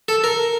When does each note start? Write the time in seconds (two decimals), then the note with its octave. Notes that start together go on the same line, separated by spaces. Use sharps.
0.08 A4
0.24 A#4